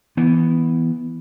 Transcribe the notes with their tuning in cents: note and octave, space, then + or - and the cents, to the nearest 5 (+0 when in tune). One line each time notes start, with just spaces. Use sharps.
E3 +0 B3 +0